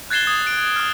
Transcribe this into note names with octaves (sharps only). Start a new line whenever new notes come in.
F#6 G#6 A6 C7 E7 G7
D#6 G#6
D7
D#6 F6